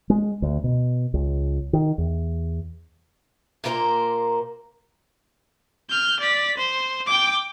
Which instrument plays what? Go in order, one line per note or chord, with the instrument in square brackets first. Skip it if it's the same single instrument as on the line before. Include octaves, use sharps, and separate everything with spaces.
[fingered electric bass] G#3
D2
B2
C#2
D#3
E2
[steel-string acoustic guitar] A#2 A#3 A#4 C5 D5 A#5
[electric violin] F6 G6
D5 B6
C5
G5 D6